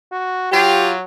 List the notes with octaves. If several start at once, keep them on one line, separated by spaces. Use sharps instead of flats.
F#4
F#3 F4 G4